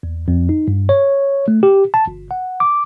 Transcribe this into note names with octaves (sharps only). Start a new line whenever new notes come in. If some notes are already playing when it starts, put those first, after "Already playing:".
E2
F2
D#4
G2
C#5
A3
G4
A5
G1
F#5
D6